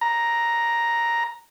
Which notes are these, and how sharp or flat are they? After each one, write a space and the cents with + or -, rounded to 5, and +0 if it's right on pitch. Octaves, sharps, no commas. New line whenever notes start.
A#5 +5